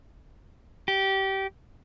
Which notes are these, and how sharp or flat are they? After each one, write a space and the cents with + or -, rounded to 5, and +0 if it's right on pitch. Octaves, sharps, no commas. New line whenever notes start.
G4 -20